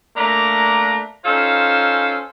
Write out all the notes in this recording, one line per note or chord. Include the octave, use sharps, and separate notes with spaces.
A3 A#3 D4 A#5
C#4 D#4 F4 A4 C5